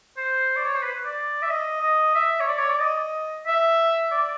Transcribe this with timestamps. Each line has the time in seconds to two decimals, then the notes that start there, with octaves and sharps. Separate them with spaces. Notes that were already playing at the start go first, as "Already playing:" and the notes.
0.17 C5
0.56 D5
0.66 C#5
0.75 C5
0.83 B4
1.05 D5
1.42 E5
1.50 D#5
1.81 D#5
2.15 E5
2.40 C#5
2.47 D5
2.59 C#5
2.70 D5
2.80 D#5
3.46 E5
4.12 D5